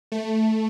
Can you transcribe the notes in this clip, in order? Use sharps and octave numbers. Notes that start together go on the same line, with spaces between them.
A3